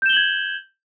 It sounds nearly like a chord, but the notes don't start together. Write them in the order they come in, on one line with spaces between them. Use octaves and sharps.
G6 E7 G7 F#7 G#6